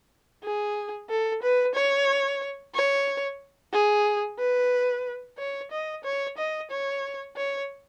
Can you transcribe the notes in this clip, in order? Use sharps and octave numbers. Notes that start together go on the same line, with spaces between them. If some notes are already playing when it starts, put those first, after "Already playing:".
G#4
A4
B4
C#5
C#5
G#4
B4
C#5
D#5
C#5
D#5
C#5
C#5